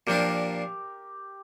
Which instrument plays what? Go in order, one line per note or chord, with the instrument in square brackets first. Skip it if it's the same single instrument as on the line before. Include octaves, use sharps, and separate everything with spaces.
[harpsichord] A#2 F3 A#3 D4 [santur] G4 A#4